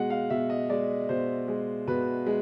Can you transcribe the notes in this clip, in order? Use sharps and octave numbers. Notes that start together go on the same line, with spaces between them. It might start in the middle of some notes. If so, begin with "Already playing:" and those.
Already playing: B2 G#3 F#5
F5
B2 E5
D#5
G#3 D5
B2 C5
G#3
B2 B4
G#3